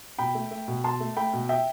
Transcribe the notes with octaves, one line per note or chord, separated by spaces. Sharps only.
B2 G5 B5
A3
A3
B2
B2 A5 C6
A3
A3 G5 B5
B2
E5 G5